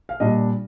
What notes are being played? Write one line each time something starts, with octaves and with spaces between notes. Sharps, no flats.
F5
A#2 G3 D4 D#5